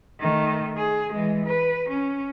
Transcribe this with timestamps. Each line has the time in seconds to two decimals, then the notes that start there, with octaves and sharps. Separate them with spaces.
0.20 D#3 A3
0.77 G#4
1.13 E3 G#3
1.45 B4
1.89 C#4